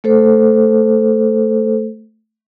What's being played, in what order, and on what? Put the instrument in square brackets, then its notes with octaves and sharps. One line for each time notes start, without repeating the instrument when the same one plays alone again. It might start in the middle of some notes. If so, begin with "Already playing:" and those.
[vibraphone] A3 A4 C5